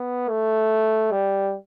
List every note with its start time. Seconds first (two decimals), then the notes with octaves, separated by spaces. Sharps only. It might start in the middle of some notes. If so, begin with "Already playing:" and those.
Already playing: B3
0.29 A3
1.12 G3